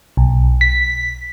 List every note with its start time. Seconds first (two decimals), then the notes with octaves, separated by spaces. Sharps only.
0.17 B1
0.61 B6